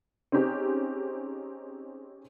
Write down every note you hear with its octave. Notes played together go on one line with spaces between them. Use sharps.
C4 C#4 D#4 G4 G#4